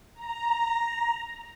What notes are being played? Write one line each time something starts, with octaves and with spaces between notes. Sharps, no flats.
A#5